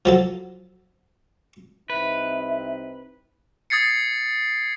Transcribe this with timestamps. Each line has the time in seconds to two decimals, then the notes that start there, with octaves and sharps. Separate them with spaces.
0.05 F3 F#3 A4
1.90 C2 C4 D#4 B4 E5
3.70 D#6 G#6 A6 C7 C#7